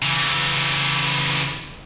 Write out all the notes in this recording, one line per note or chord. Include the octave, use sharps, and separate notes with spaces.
C#3 E3